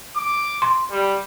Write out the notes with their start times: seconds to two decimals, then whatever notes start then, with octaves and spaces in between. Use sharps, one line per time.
0.16 D6
0.62 C6
0.91 G3